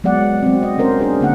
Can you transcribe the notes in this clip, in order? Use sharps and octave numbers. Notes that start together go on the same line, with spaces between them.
F#3 G#3 B3 D5 F#5
F#3 C4
D#5
C4 C#4 A#4 C5
D4 G#4 C5
D3 A#3 F#5